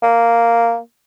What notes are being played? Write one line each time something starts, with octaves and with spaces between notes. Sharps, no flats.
A#3